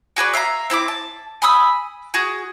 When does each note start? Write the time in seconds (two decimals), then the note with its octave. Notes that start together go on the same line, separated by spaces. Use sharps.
0.16 F#4 G#4 B4 D5
0.33 E5 F5 G#5 A#5
0.70 C4 E4 A#5 D6
0.88 A5
1.42 G#5 B5 D#6 E6
2.14 F#4 G#4